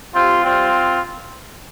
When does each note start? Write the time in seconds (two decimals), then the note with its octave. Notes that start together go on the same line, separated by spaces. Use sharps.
0.13 C3 G3 C4 F4
0.43 C3 G3 C4 F4